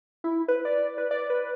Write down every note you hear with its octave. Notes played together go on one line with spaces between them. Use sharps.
E4
B4
D5
B4
D5
B4